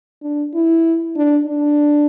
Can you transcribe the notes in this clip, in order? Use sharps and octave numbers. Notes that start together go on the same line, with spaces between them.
D4
E4
D4
D4